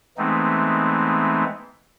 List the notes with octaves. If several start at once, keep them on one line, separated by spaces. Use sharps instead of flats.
E3 G#3 A3 B3 C4 D#4